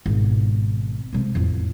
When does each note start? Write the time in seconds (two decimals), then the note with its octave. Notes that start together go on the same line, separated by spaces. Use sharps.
0.06 G#1 B2
1.13 C3 G#3
1.35 A1 F2